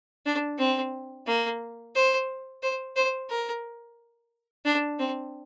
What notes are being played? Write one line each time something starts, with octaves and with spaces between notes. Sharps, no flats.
D4
C4
A#3
C5
C5
C5
A#4
D4
C4